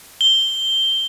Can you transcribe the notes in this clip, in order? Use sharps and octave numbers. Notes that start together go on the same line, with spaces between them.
G7